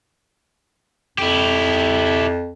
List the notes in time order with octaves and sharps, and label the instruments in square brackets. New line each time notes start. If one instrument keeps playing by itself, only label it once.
[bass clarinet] F2 [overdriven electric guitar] E4 G4